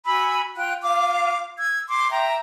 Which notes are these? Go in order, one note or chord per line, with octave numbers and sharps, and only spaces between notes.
F#4 G#5 B5 E6
F4 G5 F#6
F4 F5 D6
E6 G#6
C6 D6
E5 G5 A#5